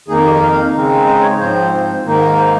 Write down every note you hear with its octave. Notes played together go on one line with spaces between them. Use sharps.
F2 D#3 A#3 D#4 G#4
G4
F5
C#3 G#3 C4 D#4
D#5
C#5
C#5
G#2 F3 C4 C5
G#2 D#3 A#3 D#4
C5